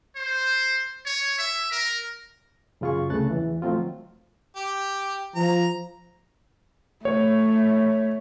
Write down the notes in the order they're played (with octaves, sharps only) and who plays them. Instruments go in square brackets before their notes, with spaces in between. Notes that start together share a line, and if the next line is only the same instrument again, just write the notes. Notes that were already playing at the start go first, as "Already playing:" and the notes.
[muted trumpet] C5
C#5
E5
A#4
[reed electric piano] F#2 C#3 F4 G#4 C#6
C2 C#3 A3 A4 F#6 A6
E2 E3
D#3 F3 F#3 A3 C4 F4
[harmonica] G4
[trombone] F3 [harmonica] A#5
[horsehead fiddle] A3 [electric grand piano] C#5